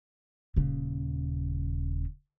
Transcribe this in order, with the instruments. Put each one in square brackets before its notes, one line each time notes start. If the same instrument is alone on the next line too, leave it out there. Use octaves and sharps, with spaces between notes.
[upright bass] D#1 C#3